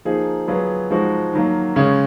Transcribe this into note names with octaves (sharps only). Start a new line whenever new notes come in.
F3 A#3 D#4 G#4
F#3 B3 F4 G#4
F3 G#3 D#4 F#4
D#3 F#3 A#3
C#3 G#3 C#4